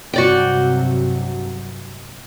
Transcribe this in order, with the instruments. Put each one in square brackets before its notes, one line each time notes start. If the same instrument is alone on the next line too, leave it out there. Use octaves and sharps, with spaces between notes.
[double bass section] G2 C3 F#3 [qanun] F#4 D5 G5